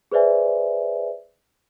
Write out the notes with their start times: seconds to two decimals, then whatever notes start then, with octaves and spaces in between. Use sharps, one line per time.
0.12 G#4 B4 C5 D5 E5 G#5